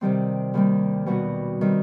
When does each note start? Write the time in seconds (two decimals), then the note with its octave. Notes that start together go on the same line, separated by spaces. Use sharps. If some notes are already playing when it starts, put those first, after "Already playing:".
0.01 C3 D#3 G3 C4
0.54 D#2 D#3 G3
1.06 B2 G3 B3 F#4
1.61 D#3 G3 C4